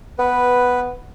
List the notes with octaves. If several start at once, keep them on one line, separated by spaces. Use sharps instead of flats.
B3 B4